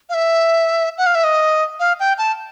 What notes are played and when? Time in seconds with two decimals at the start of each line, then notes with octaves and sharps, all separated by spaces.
0.09 F5
0.14 E5
0.98 F#5
1.06 F5
1.15 E5
1.24 D#5
1.80 F5
2.00 G5
2.18 A5